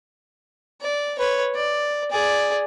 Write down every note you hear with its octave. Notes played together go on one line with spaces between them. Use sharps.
D5
B4 C#5
D5
G#4 D5